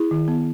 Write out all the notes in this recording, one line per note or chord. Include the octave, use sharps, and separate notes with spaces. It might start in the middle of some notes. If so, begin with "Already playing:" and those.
Already playing: E4 G#4
D#3
B3